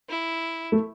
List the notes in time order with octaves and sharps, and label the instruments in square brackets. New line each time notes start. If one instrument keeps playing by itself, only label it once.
[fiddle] E4
[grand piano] A3